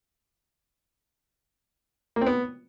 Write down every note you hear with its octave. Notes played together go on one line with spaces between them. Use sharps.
A#3
C4
B3